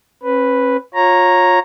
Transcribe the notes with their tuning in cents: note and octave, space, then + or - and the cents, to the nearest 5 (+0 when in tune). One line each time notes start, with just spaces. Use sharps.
C#4 -40 B4 +0
F4 +25 C#5 -15 A#5 +0